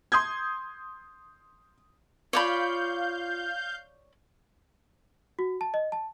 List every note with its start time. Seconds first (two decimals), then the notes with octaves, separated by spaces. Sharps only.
0.12 C6 D#6 G6 G#6
2.33 F4 C#5 D5 F5 B5 G6
5.39 F#4
5.61 A5
5.74 D#5
5.92 A5